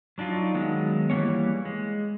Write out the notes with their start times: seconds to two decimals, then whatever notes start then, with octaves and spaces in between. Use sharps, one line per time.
0.18 F#3 D4 D#4 F4
0.54 D#3 F#3 G#3 B3
1.10 E3 G3 A#3 C#4 C#5
1.65 G#3